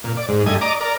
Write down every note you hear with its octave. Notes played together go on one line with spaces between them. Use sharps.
A#2
D5
G#2
G2 A3 D#5 G#5
D5 D#5 A#5 D6
A#4 D5